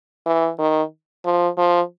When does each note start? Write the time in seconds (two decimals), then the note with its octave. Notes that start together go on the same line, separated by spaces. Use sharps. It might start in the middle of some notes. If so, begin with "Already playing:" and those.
0.26 E3
0.59 D#3
1.25 F3
1.58 F3